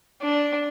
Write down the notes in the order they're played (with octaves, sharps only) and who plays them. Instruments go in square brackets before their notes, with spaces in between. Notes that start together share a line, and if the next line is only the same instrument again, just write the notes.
[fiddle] D4